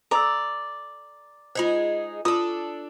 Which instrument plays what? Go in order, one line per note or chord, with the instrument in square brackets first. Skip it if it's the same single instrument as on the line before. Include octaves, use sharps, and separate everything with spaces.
[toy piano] A4 E6 [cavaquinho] D5 A#5
[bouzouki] G#3 D#4 G#4 [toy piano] F4 C5
[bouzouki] D4 A4 [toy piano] F4 [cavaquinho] D#6